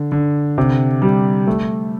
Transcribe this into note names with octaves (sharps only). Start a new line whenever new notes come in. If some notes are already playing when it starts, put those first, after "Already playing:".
Already playing: D3
D3
C3
G3
A3